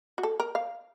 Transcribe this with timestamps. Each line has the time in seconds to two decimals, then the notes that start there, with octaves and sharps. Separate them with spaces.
0.18 F#4
0.23 A4
0.40 A#4
0.55 F5